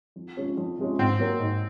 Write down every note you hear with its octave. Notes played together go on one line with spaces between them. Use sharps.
F2
C3 F3 G#3 C#4
F2
C3 F3 G#3 C#4
G#2 C4
F#3 A#3
G#2